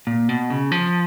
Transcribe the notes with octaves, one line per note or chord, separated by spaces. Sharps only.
A#2
B2
C#3
F3